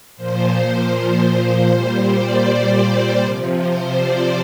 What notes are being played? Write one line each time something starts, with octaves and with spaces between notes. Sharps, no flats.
A#2 F3 C5
C5
A#2 G3 C5
D5
C5
C3 F3
C5
D5